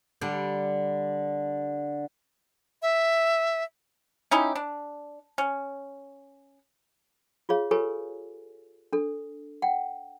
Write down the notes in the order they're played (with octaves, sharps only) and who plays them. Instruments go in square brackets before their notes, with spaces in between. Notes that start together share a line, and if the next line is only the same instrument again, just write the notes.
[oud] D3 G3
[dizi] E5
[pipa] C#4 D#4 E4 G4
D4
C#4
[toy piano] F4 G#4 C#5 F5
F4 G4 A4 B4 C#5 G#5
D4 A4
F#5 G5